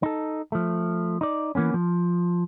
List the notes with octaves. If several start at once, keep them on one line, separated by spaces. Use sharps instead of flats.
D#4 A4
F3 A3
D#4 D5
E3 A#3 B3 C#4
F3